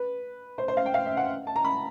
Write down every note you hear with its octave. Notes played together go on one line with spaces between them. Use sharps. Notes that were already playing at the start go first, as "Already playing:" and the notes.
Already playing: B4
C5
C5
F5
G5
F5
E5
F#5
A5
A#5
B5